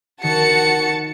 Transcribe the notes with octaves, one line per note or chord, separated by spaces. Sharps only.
D#3 F#4 A5 C#7